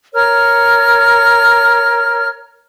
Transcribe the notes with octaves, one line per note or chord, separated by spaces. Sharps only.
A#4 C#5 F6